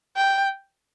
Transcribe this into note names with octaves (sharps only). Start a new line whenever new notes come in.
G5